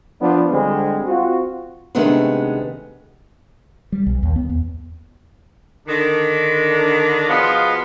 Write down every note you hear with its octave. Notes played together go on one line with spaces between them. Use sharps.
F3 B3 D4
D3 G3 G#3 C4
C4 F4 F#4
C3 D#3 G#3 A3 B3 D4
G3
B1
D#2
B3
E2
D3 D#3 D4
B2 F3 G#3 B3 F4